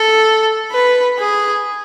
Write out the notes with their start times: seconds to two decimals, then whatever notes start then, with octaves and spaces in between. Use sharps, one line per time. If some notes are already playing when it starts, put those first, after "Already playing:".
Already playing: A4
0.71 B4
1.18 G#4